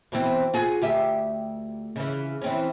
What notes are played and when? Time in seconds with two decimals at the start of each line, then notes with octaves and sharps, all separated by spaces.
0.12 B2 E3 C4
0.54 F4 F#4 G#4
0.82 D2 G4 E5
1.96 C#3 E3
2.42 E3 C4 C#4